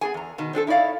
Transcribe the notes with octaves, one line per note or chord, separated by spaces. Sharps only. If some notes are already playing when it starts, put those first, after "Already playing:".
B3 G#4 G#5
E2 A#5
B2 D#3
C4 D4 G#4 A4
D#4 E4 C#5 D5 F5